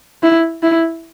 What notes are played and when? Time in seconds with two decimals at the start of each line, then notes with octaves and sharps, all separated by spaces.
0.23 E4
0.63 E4